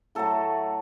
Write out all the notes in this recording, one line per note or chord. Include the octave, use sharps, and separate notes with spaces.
A2 F#3 A3 A4